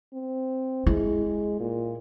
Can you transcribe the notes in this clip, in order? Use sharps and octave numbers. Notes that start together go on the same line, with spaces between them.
C4
G#3 E4
A#2